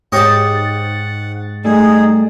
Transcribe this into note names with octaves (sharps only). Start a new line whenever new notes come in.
G#2 G4 C#5 D#5 F#5 A6
G3 A3 D#4 G#4